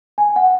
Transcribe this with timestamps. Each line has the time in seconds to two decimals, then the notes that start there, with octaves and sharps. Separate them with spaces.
0.18 G#5
0.36 F#5